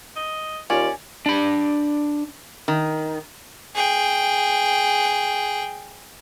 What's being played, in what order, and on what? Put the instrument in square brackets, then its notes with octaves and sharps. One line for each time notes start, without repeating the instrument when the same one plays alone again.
[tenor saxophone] D#5
[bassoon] D#2 [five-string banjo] C#4 [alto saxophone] F4 [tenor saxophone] D5
[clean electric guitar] D4 B5
[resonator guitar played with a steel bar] D#3
[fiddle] G#4 G5